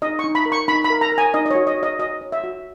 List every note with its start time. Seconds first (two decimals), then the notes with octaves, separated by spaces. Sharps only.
0.02 D#4 D#5
0.19 C#6
0.24 D#4
0.35 B5
0.46 A#4
0.52 C#6
0.68 D#4 B5
0.84 B5
0.90 A#4
1.01 A#5
1.12 A#4
1.18 G#5
1.34 D#4 D#5
1.46 D#5
1.51 F#4 C#5
1.67 D#5
1.77 F#4
1.83 D#5
1.99 F#4 D#5
2.21 C#5
2.32 E5
2.44 F#4